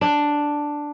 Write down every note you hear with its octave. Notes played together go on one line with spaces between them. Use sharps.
D4